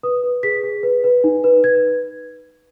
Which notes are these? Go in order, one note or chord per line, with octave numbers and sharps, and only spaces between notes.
B4 D#6
B4
G#4 B6
G#4
B4
B4
D#4
B4
B4 G#6